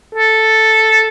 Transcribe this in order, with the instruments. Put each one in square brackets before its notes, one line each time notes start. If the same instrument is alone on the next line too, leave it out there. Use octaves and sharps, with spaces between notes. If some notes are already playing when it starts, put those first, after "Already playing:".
[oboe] A4